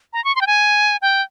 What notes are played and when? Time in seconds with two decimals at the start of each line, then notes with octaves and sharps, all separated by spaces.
0.13 A#5
0.24 C#6
0.36 C6
0.41 G5
0.47 G#5
1.02 G5